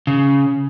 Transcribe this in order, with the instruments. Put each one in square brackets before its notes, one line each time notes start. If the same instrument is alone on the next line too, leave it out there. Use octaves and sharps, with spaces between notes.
[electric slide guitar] C#3